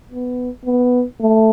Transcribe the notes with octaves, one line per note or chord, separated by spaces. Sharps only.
B3
B3
A3